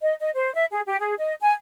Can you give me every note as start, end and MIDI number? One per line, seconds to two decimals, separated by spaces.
0.01 0.14 75
0.20 0.29 75
0.36 0.53 72
0.54 0.66 76
0.72 0.80 68
0.86 0.98 67
1.00 1.14 68
1.18 1.34 75
1.42 1.52 80